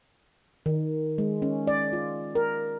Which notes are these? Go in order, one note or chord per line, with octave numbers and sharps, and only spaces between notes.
D#3
G#3
C#4
D5
F4
A#4